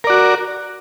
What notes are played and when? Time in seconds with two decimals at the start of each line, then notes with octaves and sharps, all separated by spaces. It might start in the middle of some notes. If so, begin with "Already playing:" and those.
0.04 A#4
0.07 D5
0.10 F#4